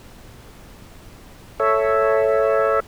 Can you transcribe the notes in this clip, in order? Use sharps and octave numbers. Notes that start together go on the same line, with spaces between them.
A4 C#5 E5